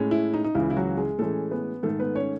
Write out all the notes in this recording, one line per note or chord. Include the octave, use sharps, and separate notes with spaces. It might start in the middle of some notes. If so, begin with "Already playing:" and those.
Already playing: A2 G#3 C#4
E4
D#4
D#4
C#2 C#3 E3 E4
E4
F#3 F#4
G#3 G#4
A2 E3 G#3 A3 C#4 A4
B3 B4
G#2 D#3 A3 A4
B3 B4
C#4 C#5